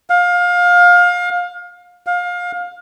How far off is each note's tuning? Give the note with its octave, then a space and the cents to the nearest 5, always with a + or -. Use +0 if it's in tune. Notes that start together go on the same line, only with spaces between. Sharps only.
F5 +25
F5 +25